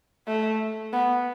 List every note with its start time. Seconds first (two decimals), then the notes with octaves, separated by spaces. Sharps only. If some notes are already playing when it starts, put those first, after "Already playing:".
0.27 A3
0.92 B3